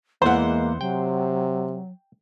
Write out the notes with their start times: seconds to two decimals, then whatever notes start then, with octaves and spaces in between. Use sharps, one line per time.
0.22 E2 E3 G#3 A#3 C5 F#5
0.81 C3 F#3 G5